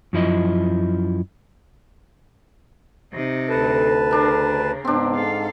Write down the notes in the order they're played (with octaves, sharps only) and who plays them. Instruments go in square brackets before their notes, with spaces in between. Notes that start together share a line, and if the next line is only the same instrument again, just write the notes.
[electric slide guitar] F#2 F3 E4 D#5
[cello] C3 D#4
[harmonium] D2 B4 A5 [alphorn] A4
[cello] C#3 [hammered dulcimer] D4 A#4
[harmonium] G#2 [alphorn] B3 [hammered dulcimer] C4 D4
[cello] A4 F5